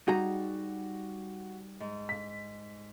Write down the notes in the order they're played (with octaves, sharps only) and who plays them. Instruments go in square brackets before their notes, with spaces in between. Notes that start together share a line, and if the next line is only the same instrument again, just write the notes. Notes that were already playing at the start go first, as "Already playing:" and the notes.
[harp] G3 [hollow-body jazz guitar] D#4 G#4 A#5 [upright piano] F#4
[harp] G#2
[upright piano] B6